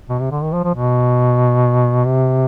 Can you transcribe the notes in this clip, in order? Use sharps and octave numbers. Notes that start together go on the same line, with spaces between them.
B2
C3
D3
D#3
F3
F3
B2
C3